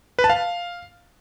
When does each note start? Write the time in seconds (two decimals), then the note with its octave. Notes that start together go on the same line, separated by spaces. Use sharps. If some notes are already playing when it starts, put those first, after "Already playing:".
0.19 B4
0.24 A5
0.30 F5